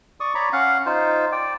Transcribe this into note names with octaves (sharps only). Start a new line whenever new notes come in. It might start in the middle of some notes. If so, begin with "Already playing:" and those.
D5 C#6 D#6
C#5 D5 A#5 B5
C#4 F5 F#5
D#4 F4 C5
D5 G5